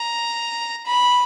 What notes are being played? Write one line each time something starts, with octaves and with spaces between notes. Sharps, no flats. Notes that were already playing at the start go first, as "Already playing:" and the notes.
Already playing: A#5
B5